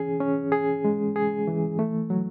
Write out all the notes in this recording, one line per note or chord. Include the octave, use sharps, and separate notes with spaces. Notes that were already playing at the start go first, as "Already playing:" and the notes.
Already playing: E3 C#4 G#4
C#4
G#4
G#3
G#4
E3
A3
F#3